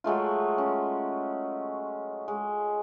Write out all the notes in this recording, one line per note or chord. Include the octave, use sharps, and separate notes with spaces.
F#3 G#3 A3 F4
C#4
G#3